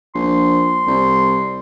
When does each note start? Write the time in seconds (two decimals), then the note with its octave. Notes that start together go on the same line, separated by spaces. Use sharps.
0.15 A#1 C6
0.87 C2